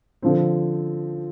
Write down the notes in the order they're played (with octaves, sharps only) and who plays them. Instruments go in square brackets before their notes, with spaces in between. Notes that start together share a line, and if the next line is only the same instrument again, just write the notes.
[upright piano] D3 F3 C4